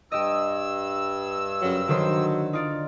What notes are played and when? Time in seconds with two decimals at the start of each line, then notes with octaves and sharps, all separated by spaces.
0.12 G2 G4 D#5 E6
1.62 F#2 C#3 F#3
1.88 D3 D#3 F#3 C5
2.53 D#4 F4 D5